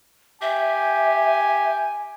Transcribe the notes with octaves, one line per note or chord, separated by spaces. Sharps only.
G4 E5 G#5